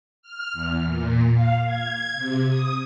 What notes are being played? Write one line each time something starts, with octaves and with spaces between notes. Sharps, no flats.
F6
E2
A#2
F5
G#6
C3
D#6